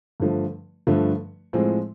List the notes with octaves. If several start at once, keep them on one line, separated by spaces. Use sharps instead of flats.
G2 D3 F3 A3
G2 D3 F3 A3
A2 F3 G#3 C4